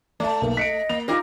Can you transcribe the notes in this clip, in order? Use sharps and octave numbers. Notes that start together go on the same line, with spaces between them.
A3 D5 A5
B1 A#3
D#5 B6 C#7 D7
A#3 F7
D#4 F4 G4 A#4